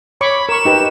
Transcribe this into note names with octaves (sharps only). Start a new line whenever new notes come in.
C#5 B5 C#6 D6
A#4 C#6 E7
D#4 G4 B4